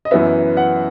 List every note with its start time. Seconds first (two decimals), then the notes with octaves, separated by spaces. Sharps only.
0.05 D#5
0.11 F#2 E3 B3 E5
0.57 F#5